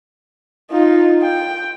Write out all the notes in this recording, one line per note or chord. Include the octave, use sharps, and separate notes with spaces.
D#4 F4
G5